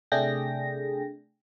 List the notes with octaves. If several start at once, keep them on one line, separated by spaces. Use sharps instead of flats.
C3 A3 D4 G#4 G5 A#6